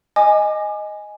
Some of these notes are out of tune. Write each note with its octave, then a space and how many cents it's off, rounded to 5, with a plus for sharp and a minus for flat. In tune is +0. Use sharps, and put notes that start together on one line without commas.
D#5 +0 G#5 +0 D6 +30